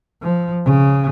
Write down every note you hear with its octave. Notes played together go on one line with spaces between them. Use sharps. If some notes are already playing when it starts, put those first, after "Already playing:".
F3
C#3